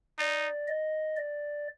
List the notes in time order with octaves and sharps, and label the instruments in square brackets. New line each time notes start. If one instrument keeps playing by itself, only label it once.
[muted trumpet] D#4 [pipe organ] D5
[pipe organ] D#5
D5